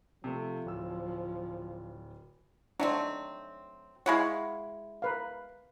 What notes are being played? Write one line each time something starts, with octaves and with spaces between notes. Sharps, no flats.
C3 F3 A3
D1 E6
F#3 A3 C4 D4 D#4
G#3 E4 F#4 C#5 F5
A#4 B4 F5